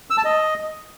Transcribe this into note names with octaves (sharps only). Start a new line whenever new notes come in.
E6
A5
D#5